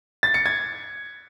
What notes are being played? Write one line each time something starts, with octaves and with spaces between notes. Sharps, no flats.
A6
C#7
G#6